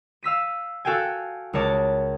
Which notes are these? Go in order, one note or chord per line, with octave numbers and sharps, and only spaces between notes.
F5 E6 B6 D#7
F#4 A4 F5 G5 G#5
C#2 A#4 C#5 A5 D6